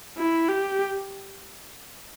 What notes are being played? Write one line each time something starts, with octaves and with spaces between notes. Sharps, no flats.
E4
G4